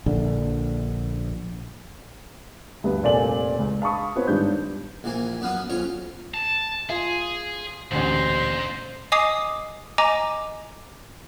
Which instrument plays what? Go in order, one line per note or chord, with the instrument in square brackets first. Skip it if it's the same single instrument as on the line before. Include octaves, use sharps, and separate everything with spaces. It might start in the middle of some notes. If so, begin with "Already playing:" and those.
[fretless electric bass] A#1 D3
[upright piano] D2 G2 B3
F1 A#2 A4 D5 G#5 F#7
C#2
F5 A5 B5 C#6 D#6
B3 C#4 F4 C5 C#5
G#1 G2 D4 G6
[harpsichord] A#1 E3 A#3 C5 G#5
F#2 B3 B4 F5 F#5 D#6
B1 C#4 F4 C5 C#5 C#6
[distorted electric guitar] A5
[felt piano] F4 [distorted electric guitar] G#4
[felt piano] A1 D2 [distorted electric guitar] A#2 [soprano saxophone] C5
[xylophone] D#5 G#5 D6 D#6 C7
D#5 G#5 A#5 D6